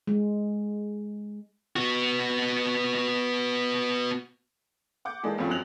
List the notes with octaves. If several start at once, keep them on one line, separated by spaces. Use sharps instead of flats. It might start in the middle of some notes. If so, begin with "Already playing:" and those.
G#3
B3 F#4
F#5 D6 G6
E3 G#3 A#3 D4 D#4
E2 G2 F3 A3 C4 C#4
F#2 F#3 C4 F#6 F7 F#7